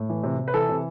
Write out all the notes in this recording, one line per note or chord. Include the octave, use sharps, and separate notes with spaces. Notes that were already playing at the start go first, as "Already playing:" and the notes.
Already playing: A2
E3
C3
C3
B4
E3 A4
C3